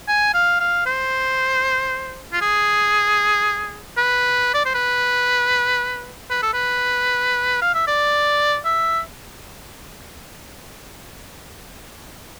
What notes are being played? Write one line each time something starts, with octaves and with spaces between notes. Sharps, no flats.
G#5
F5
F5
C5
F4
G#4
B4
D5
C5
B4
B4
A4
B4
F5
E5
D5
E5